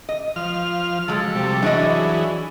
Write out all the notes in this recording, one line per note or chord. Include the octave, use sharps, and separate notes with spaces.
D#5
F3 F6
F3 F#3 G#3 A4
C3 G3
E3 F#3 D4 G#4 C#5 D#5